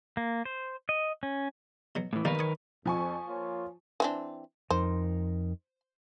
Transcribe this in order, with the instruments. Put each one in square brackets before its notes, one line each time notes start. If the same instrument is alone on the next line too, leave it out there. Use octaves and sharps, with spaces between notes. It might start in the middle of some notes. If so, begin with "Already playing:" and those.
[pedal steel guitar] A#3
C5
D#5
C#4
[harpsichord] B2 F#3
[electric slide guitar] A2 E3
[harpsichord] B2 G3 A#3 [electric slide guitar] D#3 A#4 B4
[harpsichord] C#5 D#6
[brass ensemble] F2 [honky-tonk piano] F3 G#5 C#6
[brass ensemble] A#3 F4 C#5
[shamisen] E3 C4 D4
[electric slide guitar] F2 D#4 A#4 [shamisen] C5